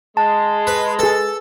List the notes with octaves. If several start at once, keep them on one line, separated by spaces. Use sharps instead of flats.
G#3 A5
B4
G#4 A4 B4